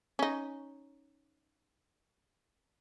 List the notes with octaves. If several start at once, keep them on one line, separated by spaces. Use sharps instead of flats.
C#4 D#4